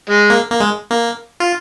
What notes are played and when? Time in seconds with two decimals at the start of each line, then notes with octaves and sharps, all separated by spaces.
0.09 G#3
0.30 A#3
0.50 A#3
0.60 G#3
0.91 A#3
1.40 F4